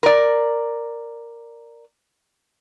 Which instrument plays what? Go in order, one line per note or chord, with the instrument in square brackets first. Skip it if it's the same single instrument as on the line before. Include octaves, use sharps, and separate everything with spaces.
[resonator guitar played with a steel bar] A#4 D5